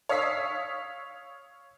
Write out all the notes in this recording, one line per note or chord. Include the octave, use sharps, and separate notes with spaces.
C#5 F5 D#6 E6 B6 C7